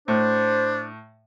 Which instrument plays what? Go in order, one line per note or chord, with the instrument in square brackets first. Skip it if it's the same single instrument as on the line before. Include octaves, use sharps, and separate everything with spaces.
[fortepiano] A2 [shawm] D4 [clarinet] C5